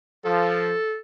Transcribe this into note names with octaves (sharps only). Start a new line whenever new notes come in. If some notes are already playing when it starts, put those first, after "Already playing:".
F3 A4